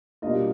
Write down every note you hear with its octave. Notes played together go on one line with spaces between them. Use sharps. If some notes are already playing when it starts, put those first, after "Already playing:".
B2 G3 A#3 D4 F4 D#5